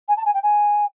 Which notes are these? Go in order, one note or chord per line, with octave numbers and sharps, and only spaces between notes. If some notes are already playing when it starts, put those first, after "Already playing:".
G#5
A5
G#5
G5
G#5